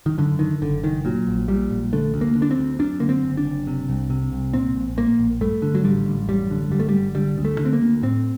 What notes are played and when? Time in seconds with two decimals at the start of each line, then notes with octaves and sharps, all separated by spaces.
0.06 D#3
0.18 F#2 D3
0.39 D3 D#3
0.62 F#1 D3
0.83 F#1 D#3
1.05 A#2 F#3
1.27 A#1
1.48 A#2 G3
1.71 A#1
1.93 D3 A3
2.14 D2
2.21 A#3
2.35 D3
2.42 D4
2.51 C4
2.58 D2
2.79 F#2 D4
3.00 D3 A#3
3.09 C4
3.23 F#1
3.37 D4
3.45 F#1
3.67 C3
3.88 C2
4.10 C3
4.32 C2
4.54 A#2 C4
4.76 A#1
4.97 A#2 A#3
5.19 A#1
5.41 G2 A3
5.62 D3
5.75 F#3
5.84 A1 G3
6.06 A1
6.28 F#2 G3
6.51 D3
6.71 G1 G3
6.80 A3
6.89 G1 G3
7.15 D3 G3
7.38 D2
7.45 A3
7.59 D3
7.65 C4
7.73 A#3
7.81 D2
8.03 A2 C4